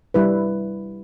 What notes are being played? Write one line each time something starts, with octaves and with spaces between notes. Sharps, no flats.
G3 E4 B4